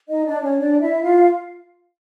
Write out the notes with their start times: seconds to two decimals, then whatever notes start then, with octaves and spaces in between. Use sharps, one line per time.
0.08 D#4 D#5
0.25 D4 D5
0.42 C#4 C#5
0.58 D4 D5
0.81 E4 E5
1.03 F4 F5